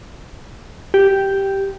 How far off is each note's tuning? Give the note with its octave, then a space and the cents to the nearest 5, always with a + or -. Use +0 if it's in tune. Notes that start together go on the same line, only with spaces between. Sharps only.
G4 -5